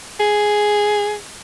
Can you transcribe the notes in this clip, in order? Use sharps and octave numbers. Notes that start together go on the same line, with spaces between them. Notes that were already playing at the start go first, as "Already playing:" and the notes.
G#4